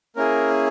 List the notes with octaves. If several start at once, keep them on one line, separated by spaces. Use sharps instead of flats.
A#3 C#4 E4 G#4 A#4